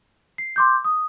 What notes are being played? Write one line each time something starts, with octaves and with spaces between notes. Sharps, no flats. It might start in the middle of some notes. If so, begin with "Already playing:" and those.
C7
C6 D6 G6
D#6